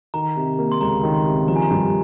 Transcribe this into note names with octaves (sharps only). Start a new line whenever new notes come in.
D#3 A#5
C3
A#3
C6
C#2 A#5
D#3
C6
C3
F3 A#5
G#5
A#5
G2